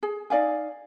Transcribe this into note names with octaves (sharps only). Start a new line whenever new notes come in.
G#4
D#4 D5 F5 G#5